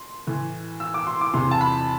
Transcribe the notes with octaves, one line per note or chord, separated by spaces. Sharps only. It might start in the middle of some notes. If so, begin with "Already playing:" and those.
Already playing: C6
A2 E3
E6
D6
C6
D6
E2 C3 E3 C6
A5
B5